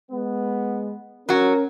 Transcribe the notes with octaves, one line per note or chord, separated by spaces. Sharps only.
G#3 B3
F#3 C#4 F#4 A#4